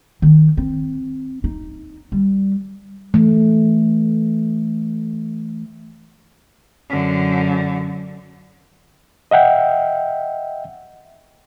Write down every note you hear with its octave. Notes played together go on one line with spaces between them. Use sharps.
D#3
C4
D#4
G3
E3 A3
F#2 D3
D#5 E5 F#5 G5